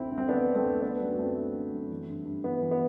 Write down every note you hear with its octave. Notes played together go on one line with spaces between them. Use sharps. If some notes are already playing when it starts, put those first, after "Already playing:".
Already playing: D2 D3 C4 E4
D2
C4
D3 B3 D4
D3
A3 C4
D2
D3 B3 D4
F#2 D4 F#4
F#2 A3 C4
D3
D3
F#2
E3
G2
G2
E3 B3
E3
B3